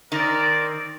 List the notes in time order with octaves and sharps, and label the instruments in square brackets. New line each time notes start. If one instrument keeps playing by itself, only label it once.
[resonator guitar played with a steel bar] D#3 [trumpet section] C4 A#4 D5